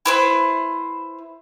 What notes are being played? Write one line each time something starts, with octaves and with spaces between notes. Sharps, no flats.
E4 B4 C5